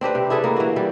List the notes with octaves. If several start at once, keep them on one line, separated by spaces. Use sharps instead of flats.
C4 D4 G4 B4
C3
E4 G#4 A4 B4
A#3
E3 F#4
G3